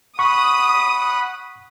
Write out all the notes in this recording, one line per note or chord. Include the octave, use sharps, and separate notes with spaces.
F#5 B5 C#6 D#6